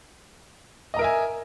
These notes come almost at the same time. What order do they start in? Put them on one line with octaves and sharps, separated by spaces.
D#5 A#5 A#4 E5 G#5